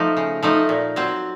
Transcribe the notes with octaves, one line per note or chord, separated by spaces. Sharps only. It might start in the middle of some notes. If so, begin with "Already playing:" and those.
Already playing: F3 A3 D#4
C#3
F3 A3 D#4
A#2
F#3 C4